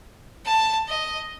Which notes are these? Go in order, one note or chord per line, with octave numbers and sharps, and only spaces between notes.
A5
D#5